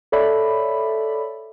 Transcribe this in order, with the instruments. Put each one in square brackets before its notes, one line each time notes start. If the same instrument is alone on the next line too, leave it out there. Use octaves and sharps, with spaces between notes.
[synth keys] A4 C#5 D5 E5 B5